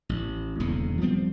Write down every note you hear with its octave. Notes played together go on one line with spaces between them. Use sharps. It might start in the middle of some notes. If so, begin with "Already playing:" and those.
A1
D#1 E2 G2 C#3
F3 G3 B3 C4